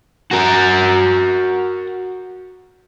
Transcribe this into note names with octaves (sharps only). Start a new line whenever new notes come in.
F#4 A#4